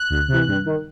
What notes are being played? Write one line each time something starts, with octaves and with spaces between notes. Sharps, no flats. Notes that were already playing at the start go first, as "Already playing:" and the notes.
Already playing: F#6
D2
C3 E3
G2
D#3